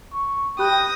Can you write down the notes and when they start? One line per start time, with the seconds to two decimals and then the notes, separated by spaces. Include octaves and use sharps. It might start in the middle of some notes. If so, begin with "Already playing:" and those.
0.13 C#6
0.59 G4 G5 B5 D#6 F#6 A#6